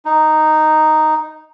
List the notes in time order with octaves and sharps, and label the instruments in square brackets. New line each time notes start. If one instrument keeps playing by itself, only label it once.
[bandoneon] D#4